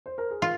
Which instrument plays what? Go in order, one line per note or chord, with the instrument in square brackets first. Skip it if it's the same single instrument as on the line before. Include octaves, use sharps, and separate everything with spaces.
[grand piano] C5
A#4
G#4
[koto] F4